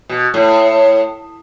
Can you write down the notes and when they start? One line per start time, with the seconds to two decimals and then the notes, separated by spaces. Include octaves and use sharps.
0.09 B2
0.34 A2